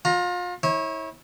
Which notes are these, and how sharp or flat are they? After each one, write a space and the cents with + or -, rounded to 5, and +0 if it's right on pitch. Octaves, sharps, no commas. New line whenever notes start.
F4 +35 A#5 +0
E4 -35 C#5 -25